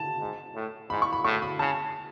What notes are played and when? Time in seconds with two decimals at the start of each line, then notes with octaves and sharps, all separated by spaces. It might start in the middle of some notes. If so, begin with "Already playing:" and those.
Already playing: A5
0.20 G#2
0.55 A2
0.90 G#2 B5
1.02 C#6
1.13 B5
1.24 A2 C#6
1.42 B5
1.59 C#3 A5